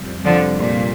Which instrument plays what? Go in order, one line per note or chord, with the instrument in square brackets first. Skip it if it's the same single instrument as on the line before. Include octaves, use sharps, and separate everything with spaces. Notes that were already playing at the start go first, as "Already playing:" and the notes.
Already playing: [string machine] F2 C3 G3
[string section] D3 F3
A#2